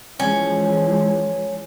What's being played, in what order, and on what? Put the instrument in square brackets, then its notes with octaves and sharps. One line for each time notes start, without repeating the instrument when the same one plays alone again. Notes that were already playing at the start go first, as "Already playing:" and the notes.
[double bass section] E3 F3 G#3 [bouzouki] C#4